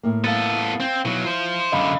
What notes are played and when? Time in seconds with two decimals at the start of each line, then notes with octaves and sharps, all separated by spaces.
0.03 A2 A#3
0.24 B3 A4 F5 A6
0.80 C4
1.05 B2 F#3 E4
1.25 F4 C5
1.72 F#2 D3 D#5 F5 B5